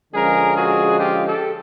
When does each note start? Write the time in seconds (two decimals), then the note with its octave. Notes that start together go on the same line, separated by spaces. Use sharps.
0.13 D3 F3 G#3 C#4 G#4 A#4
0.55 F#4 G#4
0.98 F4 G4
1.26 G4 A4